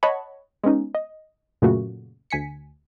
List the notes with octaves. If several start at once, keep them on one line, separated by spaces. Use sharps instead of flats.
C#5 D#5 F#5 A5 B5 C#6
G#3 B3 C#4 D#4
D#5
F#2 A#2 C#3 A3 A#3 F#4
D2 G#5 B6 C#7